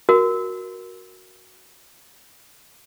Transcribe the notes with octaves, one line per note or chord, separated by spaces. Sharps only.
F#4 A#4